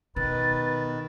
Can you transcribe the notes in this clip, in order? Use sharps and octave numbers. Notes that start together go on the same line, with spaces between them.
B2 D#3 B4 A6